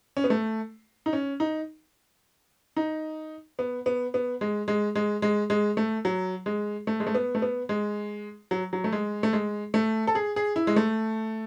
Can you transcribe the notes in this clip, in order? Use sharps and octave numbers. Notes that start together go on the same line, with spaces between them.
C#4
B3
A3
D#4
C#4
D#4
D#4
B3
B3
B3
G#3
G#3
G#3
G#3
G#3
A3
F#3
G#3
A3
G#3
A3
B3
A3
B3
G#3
F#3
F#3
A3
G#3
A3
G#3
A3
A4
G#4
G#4
E4
G#3
A3